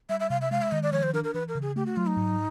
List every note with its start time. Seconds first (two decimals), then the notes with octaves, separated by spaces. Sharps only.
0.09 G3 E5
0.20 E5
0.30 C3 F5
0.41 E5
0.51 G#3 F5
0.62 E5
0.72 D#3 D#5
0.83 D5
0.92 F3 C#5
1.03 C5
1.14 D4 A#4
1.24 A#4
1.34 E3 B4
1.48 A#4
1.55 C#3
1.62 G#4
1.76 A3 G4
1.86 F#4
1.97 F#3 F4
2.07 D#4
2.17 G#2